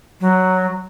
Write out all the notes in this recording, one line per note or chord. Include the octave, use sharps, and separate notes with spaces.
F#3